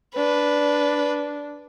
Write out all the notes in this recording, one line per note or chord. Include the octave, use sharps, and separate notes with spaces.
D4 B4